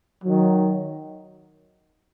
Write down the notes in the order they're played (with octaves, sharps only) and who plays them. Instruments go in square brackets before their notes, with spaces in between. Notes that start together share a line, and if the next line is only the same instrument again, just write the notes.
[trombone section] D#3 F#3